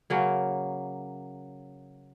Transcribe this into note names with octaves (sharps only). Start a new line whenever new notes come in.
C#3 F#3 A#3